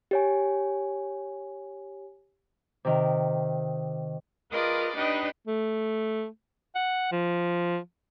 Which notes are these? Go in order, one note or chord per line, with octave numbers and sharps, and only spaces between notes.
G4 C#5 G#5
C3 D#3
F4 G#4 A#4 B4 D5 D#5
D4 D#4 G4 B4 D#5
A3
F#5
F3